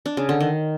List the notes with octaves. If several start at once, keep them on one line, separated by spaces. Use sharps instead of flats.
D4
C#3
D3
D#3